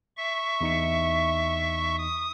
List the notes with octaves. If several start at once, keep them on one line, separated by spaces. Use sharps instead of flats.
E5 C#6
E2 D#4 C#7
D#6